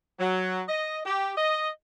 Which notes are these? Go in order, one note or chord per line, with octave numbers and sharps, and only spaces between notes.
F#3
D#5
G4
D#5